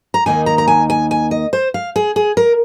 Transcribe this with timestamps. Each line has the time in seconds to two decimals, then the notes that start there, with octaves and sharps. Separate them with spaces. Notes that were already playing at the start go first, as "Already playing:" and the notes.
0.14 A#5
0.26 D#2 D#3 A#3 D#4 G#5
0.46 A#5
0.58 A#5
0.68 G#5
0.90 G#5
1.11 G#5
1.31 D#5
1.53 C5
1.74 F5
1.96 G#4
2.16 G#4
2.37 A#4